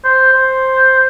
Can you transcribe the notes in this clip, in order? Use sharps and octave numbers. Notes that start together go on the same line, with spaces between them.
C5
C5